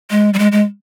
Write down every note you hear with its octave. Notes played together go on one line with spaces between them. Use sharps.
G#3
G3
G#3
G#3